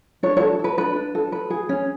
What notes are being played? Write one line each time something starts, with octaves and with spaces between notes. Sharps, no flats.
D4 C#5
C#5
A4
A4 B4
D4 B4
D4
A4
B4
G#4
C#4